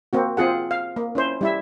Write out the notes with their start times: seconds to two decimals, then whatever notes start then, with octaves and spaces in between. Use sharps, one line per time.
0.13 A#3 C4 F#4
0.37 C4 F4 G#4 F#5
0.71 F5
0.96 A#3
1.15 C#4 E4 C5
1.41 G3 E4 E5